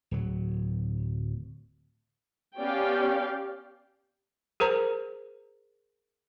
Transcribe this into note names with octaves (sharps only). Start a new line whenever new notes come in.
D1 F#3
B3 C#4 G4 D5 F5 G5
G#4 A#4 C5 A#5